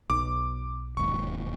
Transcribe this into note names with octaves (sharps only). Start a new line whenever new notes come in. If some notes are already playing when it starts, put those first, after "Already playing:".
B1 D6
E1 D#2 G#2 C#6